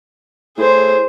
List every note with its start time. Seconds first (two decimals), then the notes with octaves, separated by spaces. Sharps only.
0.57 A2 G#4 C5